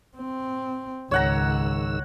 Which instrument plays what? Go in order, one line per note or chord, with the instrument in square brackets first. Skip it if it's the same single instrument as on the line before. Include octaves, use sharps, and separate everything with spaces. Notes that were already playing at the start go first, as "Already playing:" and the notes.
[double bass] C4
[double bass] C#2 [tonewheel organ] G#2 D#3 E6 [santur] C#5 F#5 A#5